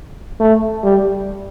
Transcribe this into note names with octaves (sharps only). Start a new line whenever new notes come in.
A3
G3